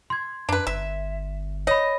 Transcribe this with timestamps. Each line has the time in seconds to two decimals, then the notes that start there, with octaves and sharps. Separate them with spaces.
0.10 C6 G#6
0.49 F#2 D4 B4
0.67 G1 E5
1.67 C#5 D#5 B5